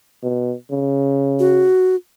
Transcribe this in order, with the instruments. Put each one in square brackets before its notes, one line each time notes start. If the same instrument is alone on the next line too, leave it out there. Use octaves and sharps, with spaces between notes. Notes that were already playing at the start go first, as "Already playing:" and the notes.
[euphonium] B2
C#3
[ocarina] F#4